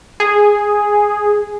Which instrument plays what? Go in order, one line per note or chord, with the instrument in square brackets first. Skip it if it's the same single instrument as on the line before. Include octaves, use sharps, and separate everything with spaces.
[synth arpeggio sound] G#4